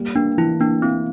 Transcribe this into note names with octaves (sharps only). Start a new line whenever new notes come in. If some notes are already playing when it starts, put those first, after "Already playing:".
Already playing: G3 A#3
A#3 D4
E3 E4
A#3 D4
C4 E4